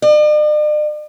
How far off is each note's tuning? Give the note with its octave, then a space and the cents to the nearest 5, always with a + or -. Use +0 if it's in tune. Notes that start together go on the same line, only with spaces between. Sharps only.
D5 +45